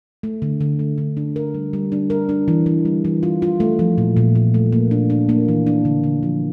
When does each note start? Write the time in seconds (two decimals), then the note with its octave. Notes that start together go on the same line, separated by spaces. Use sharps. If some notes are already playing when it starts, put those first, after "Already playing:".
0.23 A3
0.42 D3
0.61 D3
0.79 A3
0.98 D3
1.17 D4
1.36 A#4
1.54 G3
1.73 G3
1.92 D4
2.10 A#4
2.29 D4
2.48 E3
2.66 E3
2.85 G3
3.05 E3
3.23 F4
3.42 F4
3.60 A3
3.79 F3
3.98 A#2
4.17 A#2
4.35 A#2
4.54 A3
4.72 A#3
4.91 D4
5.10 D4
5.29 A#3
5.48 E3
5.67 D4
5.85 D3
6.04 D3
6.23 F3